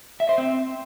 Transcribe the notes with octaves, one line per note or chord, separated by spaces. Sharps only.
E5
C5
C4